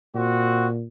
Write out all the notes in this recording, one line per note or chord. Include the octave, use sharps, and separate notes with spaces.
A#2 C4 F#4